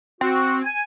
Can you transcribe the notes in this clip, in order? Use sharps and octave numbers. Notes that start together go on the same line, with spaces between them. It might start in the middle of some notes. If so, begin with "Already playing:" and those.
C4 F#4
G#5